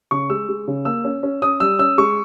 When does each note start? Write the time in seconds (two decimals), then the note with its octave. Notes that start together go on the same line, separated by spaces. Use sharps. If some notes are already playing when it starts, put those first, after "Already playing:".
0.11 C#3 C#6
0.30 G#3 E6
0.49 G#3
0.68 C#3
0.85 A#3 E6
1.04 C#4
1.23 C#4
1.42 C#4 D#6
1.60 G3 E6
1.79 C#4 E6
1.98 G#3 C#6